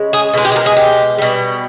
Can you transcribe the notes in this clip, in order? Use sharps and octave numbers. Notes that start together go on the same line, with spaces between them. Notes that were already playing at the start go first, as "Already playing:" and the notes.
Already playing: C#3 G#3
G#4
B2 G#3
G4
G#4
A#4
G#4
G4
B2 G3